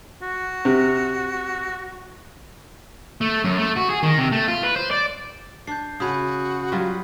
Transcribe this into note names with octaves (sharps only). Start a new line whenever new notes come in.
F#4
C3
A3
F#2
A3
F#4
G#4
D#3
C3
A3
F4
B4
C5
D5
D4 G6 C7
C#3 F#4 G#5 B5 D#6
F#3 G3 F4